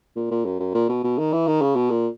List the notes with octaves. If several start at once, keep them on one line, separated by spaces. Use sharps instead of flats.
A#2
A#2
F#2
F#2
A#2
B2
B2
D#3
E3
D#3
C#3
B2
A#2